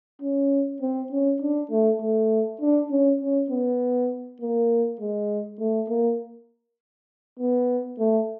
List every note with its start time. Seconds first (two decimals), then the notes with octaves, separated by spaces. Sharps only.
0.21 C#4
0.81 C4
1.11 C#4
1.42 D4
1.71 A3
2.02 A3
2.61 D4
2.91 C#4
3.21 C#4
3.50 B3
4.41 A#3
5.00 G#3
5.59 A3
5.89 A#3
7.39 B3
7.99 A3